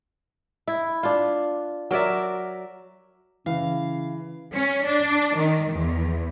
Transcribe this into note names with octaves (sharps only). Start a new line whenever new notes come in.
E4
D4 F4
F#3 A#4 D5 E5
C#3 E3 F5
C#4
D4
D#3
E2